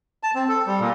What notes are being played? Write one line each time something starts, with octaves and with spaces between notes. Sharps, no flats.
A5
C4
A4
G3
A#2